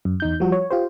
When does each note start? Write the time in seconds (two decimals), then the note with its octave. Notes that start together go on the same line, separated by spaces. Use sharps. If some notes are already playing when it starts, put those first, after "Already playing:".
0.05 F#2
0.20 E2 D#4 G6
0.40 F3 G3 F#4
0.52 C#5
0.71 F4 G4 C5